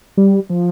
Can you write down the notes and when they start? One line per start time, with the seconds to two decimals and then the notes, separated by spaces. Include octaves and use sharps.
0.17 G3
0.50 F3